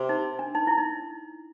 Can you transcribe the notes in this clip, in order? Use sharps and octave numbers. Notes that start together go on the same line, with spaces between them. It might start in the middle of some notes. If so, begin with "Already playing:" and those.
Already playing: C3
D#4
D4
D#4
E4
D#4